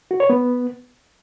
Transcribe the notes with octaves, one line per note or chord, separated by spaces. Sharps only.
F#4
C#5
B3